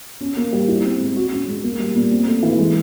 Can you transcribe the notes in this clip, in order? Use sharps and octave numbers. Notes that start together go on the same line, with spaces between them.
C#4
A#3
G3
E4
C4
G#3
F#4
C#4
G#3
A#3
G3
A#2
C4
A3
E3
G#3